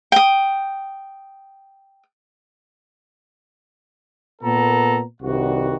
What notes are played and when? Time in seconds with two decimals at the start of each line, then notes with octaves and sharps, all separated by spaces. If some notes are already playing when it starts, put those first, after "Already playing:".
0.12 G5 D#6
4.41 A#2 A#3 B3 A4 A#5
5.23 C2 G2 D#3 F#4